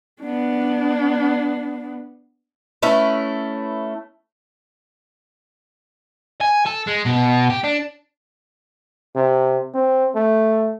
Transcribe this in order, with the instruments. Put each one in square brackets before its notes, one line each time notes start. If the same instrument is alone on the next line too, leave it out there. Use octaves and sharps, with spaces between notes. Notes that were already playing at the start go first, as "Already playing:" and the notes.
[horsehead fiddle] B3 D4
[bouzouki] A3 C#4 E4 B4
[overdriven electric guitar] G#5
A4
G#3
B2
G4
D4
[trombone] C3
C4
A3